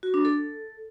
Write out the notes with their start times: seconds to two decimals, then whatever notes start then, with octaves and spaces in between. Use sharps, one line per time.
0.03 F#4
0.14 D4
0.25 A4